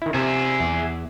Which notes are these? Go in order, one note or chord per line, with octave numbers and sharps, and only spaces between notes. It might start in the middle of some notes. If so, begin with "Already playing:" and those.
D#3 E4
C3 G#4 E5
E2